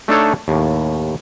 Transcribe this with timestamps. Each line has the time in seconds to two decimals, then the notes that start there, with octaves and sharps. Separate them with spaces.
0.08 A3 D4 D#4 A4 C#5
0.48 D#2 A2